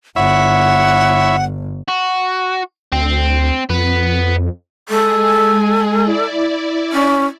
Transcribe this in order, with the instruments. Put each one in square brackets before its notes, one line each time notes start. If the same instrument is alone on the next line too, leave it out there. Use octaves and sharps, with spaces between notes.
[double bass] G1 [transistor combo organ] E4 C#5 E5 [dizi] F#5
[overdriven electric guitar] F#4
[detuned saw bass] D2 [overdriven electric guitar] C4
[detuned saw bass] F2 [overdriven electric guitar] B3
[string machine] G#3 G#4 [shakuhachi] A4
[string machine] E4 D5
[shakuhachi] C#4